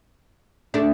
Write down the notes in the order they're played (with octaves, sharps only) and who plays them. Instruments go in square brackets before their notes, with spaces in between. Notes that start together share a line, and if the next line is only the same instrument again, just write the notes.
[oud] A3 D4